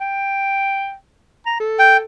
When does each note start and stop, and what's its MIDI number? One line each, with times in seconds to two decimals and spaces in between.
0.01 0.94 79
1.46 1.57 82
1.60 2.03 69
1.79 1.97 79